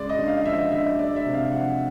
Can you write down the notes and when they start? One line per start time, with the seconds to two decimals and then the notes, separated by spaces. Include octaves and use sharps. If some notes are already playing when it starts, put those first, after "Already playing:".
Already playing: C#3 G#3 D5
0.09 D#5
0.18 D3
0.27 F5
0.41 F5
0.45 F3 E5
0.59 D#5
0.72 D3 E5
0.86 D5
0.98 G#3 D5
1.16 E5
1.25 C3
1.34 F5
1.52 F3 F#5